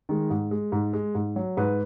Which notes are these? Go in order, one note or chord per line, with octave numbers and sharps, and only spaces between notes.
D#3 G#3
G#2
G#3
G#2
G#3
G#2
F#3
G#2 B4